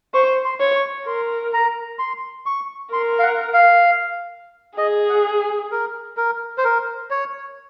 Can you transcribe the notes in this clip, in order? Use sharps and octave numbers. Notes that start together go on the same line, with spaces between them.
C5 C#6
C6
C#5
C#6
A#4 C6
A#5
C6
C#6
A#4 C6
F5
F#5
F5
G#4 D#5
F#5
G#5
A#4
A#4
C5
A#4
C#5